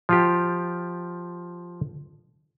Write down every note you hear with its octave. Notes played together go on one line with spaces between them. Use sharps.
F3 F4 G4